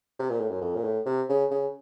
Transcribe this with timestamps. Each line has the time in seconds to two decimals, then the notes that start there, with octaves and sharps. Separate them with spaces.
0.19 C3
0.30 A#2
0.40 A2
0.50 F#2
0.61 F2
0.76 A#2
0.84 A2
1.06 C3
1.29 C#3
1.51 C#3